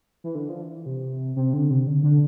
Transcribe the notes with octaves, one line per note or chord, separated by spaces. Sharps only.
E3
D3
F3
E3
C3
C3
D3
C3
D3
D3